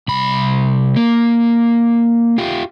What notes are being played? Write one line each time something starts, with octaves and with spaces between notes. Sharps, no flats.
C2 B5
A#3
F4 G4